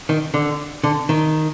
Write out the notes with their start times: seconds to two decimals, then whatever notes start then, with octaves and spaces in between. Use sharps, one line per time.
0.09 D#3
0.34 D3
0.84 D3
1.09 D#3